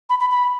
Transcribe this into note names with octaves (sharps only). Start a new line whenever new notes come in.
B5
B5
B5